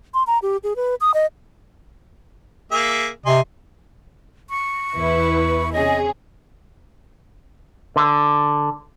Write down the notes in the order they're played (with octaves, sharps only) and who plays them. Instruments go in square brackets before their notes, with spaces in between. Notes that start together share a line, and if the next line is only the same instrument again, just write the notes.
[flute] C6
A#5
G4
G#4
B4
D#6
D#5
[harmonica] A#3 G#4 E5
[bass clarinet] C3 [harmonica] D#5 G#5 C6
[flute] C#6
[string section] E2 E4 B4
[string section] C3 C#4 G#4 [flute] D#5
[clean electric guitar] D3